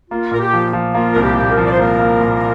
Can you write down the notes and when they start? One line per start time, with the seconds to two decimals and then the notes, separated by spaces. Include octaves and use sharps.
0.11 A#3 F4
0.31 A#2 A#4
0.39 G4
0.53 F3
0.73 F3
0.94 A#3 F4
1.13 C2 A#4
1.23 G4
1.37 A#2
1.51 A#4
1.57 F3
1.65 D5
1.71 C5
1.78 A#3 A#4
1.99 A#3
2.21 A#2